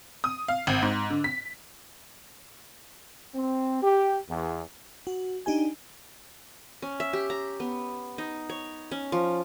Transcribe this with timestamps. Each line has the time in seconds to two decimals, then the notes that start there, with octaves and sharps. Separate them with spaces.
0.24 D#6
0.48 F5
0.67 G#1
0.82 G#2
1.10 D3
1.24 B6
3.35 C4
3.82 G4
4.29 E2
5.07 F#4
5.46 D4 D#4 G4 G#5
6.82 C#4
7.00 E5
7.13 G4
7.30 A#5
7.60 B3
8.18 D#4
8.49 C#5
8.91 C#4
9.12 F3